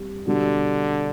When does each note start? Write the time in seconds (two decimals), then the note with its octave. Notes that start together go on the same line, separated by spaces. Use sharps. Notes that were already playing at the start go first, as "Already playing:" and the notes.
Already playing: G3 C4 G4
0.27 B2 D3 G3 D4